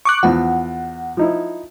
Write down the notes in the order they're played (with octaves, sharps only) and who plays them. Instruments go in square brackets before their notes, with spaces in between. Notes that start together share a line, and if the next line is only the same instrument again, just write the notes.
[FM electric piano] C#6 D6 F#6
[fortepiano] E2 F3 [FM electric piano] F#5
[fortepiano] F3 D#4 E4